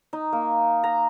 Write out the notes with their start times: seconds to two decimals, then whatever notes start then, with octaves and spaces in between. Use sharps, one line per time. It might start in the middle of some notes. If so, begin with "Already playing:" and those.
0.13 D#4
0.33 A#3
0.84 A#5